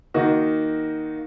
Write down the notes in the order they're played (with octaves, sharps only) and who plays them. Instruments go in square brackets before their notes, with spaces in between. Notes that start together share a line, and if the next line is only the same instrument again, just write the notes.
[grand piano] D#3 A#3 D#4 F#4